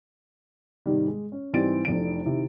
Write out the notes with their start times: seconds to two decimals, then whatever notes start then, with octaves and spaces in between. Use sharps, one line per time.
0.86 G#2 C3 D#3 G3
1.08 G#3
1.32 C#4
1.53 G#2 E3 G3 C4 A6 D7
1.85 F1 F2 E3 D4 D7
2.26 C3 D#3 E4